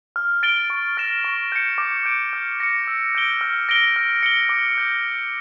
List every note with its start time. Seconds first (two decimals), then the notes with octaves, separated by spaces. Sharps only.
0.16 F6
0.43 A6 D7 G7
0.70 C#6
0.97 F6 A#6 E7
1.25 C#6
1.52 G6 C#7
1.78 D6
2.05 G6 D7
2.33 F6
2.60 A#6 C#7
2.87 E6
3.15 G6 D7 G7
3.41 F6
3.69 A#6 D7 G7
3.96 F6
4.23 C#7 G7
4.49 D6
4.78 G6 A#6